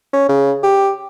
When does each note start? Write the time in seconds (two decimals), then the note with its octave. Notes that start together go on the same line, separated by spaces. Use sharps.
0.13 C#4
0.29 C#3
0.63 G4